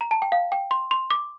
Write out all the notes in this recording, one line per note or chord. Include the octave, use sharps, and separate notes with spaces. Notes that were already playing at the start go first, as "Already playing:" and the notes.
A#5
A5
G5
F5
G5
C6
C6
D6